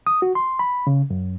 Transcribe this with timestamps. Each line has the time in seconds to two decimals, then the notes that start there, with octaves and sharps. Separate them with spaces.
0.07 D#6
0.22 F#4
0.35 C6
0.59 B5
0.87 C#3
1.10 F#2